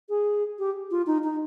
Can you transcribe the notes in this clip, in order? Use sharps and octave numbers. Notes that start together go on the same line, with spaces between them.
G#4
G4
F4
D#4
D#4